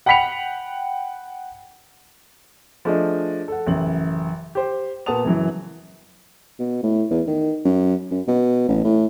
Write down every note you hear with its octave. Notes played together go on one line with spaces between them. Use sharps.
F#5 G5 B5 B6 C#7 F7
F3 A3 D4 G#4 D#5
A4 F#5
A1 F#2 C#3 F#7
G4 C5
A#2 B3 F#5 A5 D#6 F7
F#2 C#3 E3 F#3
B2
A2
E2
D#3
F#2
F#2
B2
A1
A2